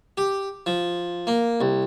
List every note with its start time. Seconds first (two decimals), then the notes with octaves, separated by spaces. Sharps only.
0.18 G4
0.66 F3
1.27 A#3
1.61 C2